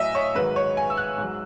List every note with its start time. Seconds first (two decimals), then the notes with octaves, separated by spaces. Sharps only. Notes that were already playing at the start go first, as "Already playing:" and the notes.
Already playing: A2 F#3 D#5 E5 G#5
0.15 C#5
0.35 G#2 D#3 F#3 B4
0.56 C#5
0.77 G#5
0.90 E6
0.97 F#6
1.18 G#2
1.23 F#3